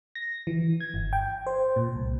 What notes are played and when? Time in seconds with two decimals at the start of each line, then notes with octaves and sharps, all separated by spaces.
0.15 A#6
0.47 E3
0.81 G#6
0.94 G1
1.13 G5
1.47 C5
1.76 A#2
1.96 C2